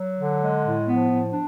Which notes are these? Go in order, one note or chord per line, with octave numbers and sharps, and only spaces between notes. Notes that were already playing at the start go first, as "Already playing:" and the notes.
Already playing: F#3
D3
G#3
A2
F3 B3
A2
D4